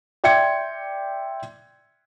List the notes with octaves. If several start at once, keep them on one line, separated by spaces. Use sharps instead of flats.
D5 E5 G5 C6 G#6 C#7